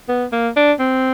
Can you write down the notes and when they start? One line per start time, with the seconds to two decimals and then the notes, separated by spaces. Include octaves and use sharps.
0.08 B3
0.32 A#3
0.56 D4
0.79 C4